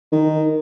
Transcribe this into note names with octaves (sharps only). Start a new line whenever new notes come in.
D#3